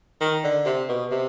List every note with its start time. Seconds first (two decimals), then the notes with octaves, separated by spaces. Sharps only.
0.21 D#3
0.44 D3
0.66 C3
0.89 B2
1.12 C3